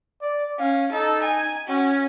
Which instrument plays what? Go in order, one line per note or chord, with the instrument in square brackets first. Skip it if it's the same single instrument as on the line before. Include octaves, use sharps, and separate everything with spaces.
[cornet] D5
[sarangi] C#4 [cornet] F5
[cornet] D#4 [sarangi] A4
[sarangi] G#5
[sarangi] C#4 [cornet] F#4